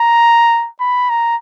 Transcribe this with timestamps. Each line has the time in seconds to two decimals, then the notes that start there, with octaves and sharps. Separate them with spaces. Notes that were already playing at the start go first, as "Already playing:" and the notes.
Already playing: A#5
0.80 B5
1.10 A#5